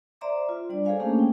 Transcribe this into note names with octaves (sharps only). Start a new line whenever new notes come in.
C5 D5 E5 A#5 C6 D6
F4
G3 D4 D5
G#4 A4 C5 C#5 F5 G#5
A3 A#3 C#4 D4 G4 A4
G5